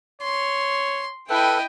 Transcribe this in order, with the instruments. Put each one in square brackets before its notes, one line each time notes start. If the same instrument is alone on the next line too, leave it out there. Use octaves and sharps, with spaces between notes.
[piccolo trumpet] C#5 [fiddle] C6
[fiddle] E4 D#5 [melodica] A4 B4 [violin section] G5